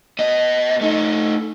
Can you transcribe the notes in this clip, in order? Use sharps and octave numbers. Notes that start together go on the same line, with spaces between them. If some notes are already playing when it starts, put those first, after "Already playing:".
B3 D#5
A3 D#4